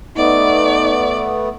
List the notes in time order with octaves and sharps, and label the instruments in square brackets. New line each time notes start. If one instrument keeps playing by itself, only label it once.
[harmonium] A3 B3 [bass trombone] D#4 [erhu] D5